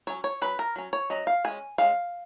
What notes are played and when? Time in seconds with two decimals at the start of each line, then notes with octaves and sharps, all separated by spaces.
0.07 F#3 C#4 C#5
0.24 C#5
0.41 F#3 C#4 B4
0.59 A#4
0.76 F#3 C#4
0.93 C#5
1.10 F#3 C#4 D#5
1.27 F5
1.44 G#3 C#4 G#5
1.78 G#3 C#4 F5